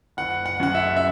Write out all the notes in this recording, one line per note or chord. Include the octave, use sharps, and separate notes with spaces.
F#1 F#5
F#5
F#2 C#3 F#5
E5
E5